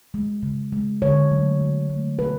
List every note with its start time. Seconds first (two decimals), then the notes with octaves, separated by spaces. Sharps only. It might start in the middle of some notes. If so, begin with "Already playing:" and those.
0.14 G#3
0.43 C#3
0.72 G#3
1.02 D3 C#5
1.31 F#3 A3
1.60 D3
1.89 F#3 A3
2.19 B2 B4